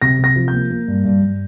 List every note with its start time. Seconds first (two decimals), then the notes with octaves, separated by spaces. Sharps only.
0.02 C3 A#6
0.19 C3 A#6
0.36 F3
0.48 G6
0.53 A#3
0.71 A#3
0.88 G2
1.05 G2
1.22 G2